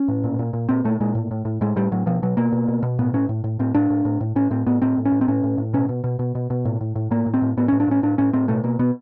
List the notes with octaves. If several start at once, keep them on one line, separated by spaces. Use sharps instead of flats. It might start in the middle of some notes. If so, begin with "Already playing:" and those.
Already playing: C#4
A2
A#2
A#2
A#2
A#2 C4
A#2 A3
A#2 G#3
A2
A2
A2
A2 G#3
A2 G3
A2 F#3
B2 F3
B2 F#3
B2 A#3
B2
B2
B2
A2 B3
A2 C#4
A2
A2
A2 C4
A2 D4
A2
A2
A2
A2 C#4
A2 C4
A2 B3
A2 C4
A2
C#4
A2
C4
A2 C#4
A2
A2
B2 C#4
B2
B2
B2
B2
B2
A2
A2
A2
A2 A#3
A2
C4
A2
A2 B3
C#4
A2
D4
A2 C#4
A2 D4
A2 C#4
A2 C4
B2 A3
B2 A#3
B2 B3